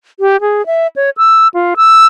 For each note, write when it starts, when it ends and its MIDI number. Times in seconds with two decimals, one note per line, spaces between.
0.20 0.40 67
0.41 0.65 68
0.66 0.87 76
0.96 1.10 73
1.17 1.48 88
1.54 1.74 65
1.77 2.06 88